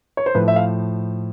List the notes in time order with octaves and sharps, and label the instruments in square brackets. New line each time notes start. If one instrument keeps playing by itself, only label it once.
[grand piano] C#5
C5
A2 F3 B4
E5
F5